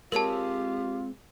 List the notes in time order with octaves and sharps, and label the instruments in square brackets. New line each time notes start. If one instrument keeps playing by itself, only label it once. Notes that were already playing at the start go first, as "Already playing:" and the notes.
[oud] G#3 C4 C#5 [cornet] F4 [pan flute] G4 [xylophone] A#4 A5